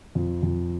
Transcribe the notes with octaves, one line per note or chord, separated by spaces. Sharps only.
F2
F2